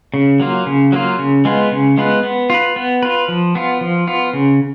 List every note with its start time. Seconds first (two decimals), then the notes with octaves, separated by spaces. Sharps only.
0.14 C#3
0.40 F#3 A#3 F4
0.66 C#3
0.92 F#3 A#3 F4
1.19 C#3
1.45 G#3 B3 F4 B4
1.72 C#3
1.98 G#3 B3 F4 B4
2.23 B3
2.50 F4 B4
2.76 B3
3.03 F4 B4
3.28 F3
3.55 B3 F4
3.81 F3
4.07 B3 F4
4.33 C#3